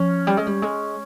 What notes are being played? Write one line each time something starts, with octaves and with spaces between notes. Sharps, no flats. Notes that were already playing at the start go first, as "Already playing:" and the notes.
Already playing: F3 C#4
G3
G#3
G3
G#3